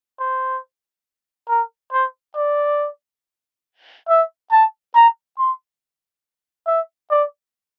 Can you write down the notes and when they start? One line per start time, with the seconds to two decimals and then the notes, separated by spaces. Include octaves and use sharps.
0.20 C5
1.49 A#4
1.93 C5
2.36 D5
4.09 E5
4.52 A5
4.95 A#5
5.38 C6
6.67 E5
7.11 D5